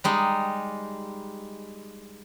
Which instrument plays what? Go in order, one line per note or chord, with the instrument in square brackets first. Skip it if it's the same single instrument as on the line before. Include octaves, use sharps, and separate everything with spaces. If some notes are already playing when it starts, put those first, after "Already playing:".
[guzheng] G3 G#3 D#4